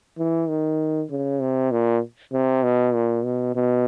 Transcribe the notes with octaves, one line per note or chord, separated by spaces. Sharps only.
E3
D#3
C#3
C3
A#2
C3
B2
A#2
B2
B2